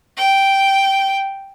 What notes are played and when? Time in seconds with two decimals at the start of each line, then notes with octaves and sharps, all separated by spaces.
0.17 G5